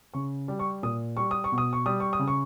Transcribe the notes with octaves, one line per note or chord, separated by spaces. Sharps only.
C#3 C#6
G3
C#6
A#2 D#6
G3 C#6
D#6
C#6
B2
D#6
C#6
G3 D#6
C#6
D#6
C#3
C#6